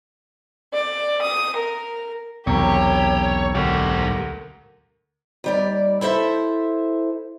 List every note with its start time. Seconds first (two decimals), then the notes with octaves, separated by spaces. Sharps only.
0.73 D5
1.22 D#6
1.55 A#4
2.47 E1 B1 C3 G4 C#5
3.54 D2 G#2 G4 A#4
5.44 D#2 G3 D5
6.01 E4 A4 C5 E5